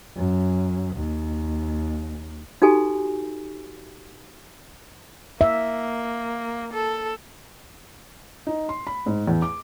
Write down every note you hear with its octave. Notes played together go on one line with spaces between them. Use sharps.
F#2
D#2
D#4 F#4 G4 A4 G#5
A#3 E5
A4
D#4
C6
B5
G#2
E2
D6